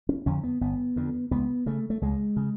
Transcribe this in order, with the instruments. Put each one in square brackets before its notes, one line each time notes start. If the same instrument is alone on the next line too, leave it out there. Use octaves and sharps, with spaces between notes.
[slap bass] C#4
F2 D3 C#4
B3
G1 B3
F2 D3
C#2 B3
C#3 A3
A3
C#2 G#3
C#3